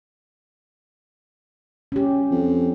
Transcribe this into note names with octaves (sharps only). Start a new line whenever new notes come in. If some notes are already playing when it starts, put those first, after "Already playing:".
C#4 G4
F2